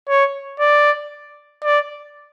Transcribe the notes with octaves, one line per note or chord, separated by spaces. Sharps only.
C#5
D5
D5